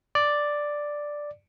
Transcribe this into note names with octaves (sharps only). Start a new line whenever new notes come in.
D5